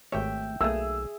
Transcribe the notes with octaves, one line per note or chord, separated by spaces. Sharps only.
G#1 A3 G4 C#5 E5 G5
B1 A3 A#3 G#4 E5 E6